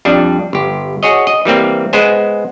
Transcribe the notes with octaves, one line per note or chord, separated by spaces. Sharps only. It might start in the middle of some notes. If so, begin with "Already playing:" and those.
F2 G3 D4
G1 G4
F#4 G#4 C#5 D#5
D#5
E3 G3 A#3 C4
G#3 B3 C5 G#5